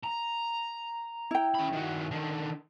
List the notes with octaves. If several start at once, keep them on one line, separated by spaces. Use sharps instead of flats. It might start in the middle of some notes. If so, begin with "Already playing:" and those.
A#5
E4 G5
C#4 B5
D#3 F#4
D3 D#3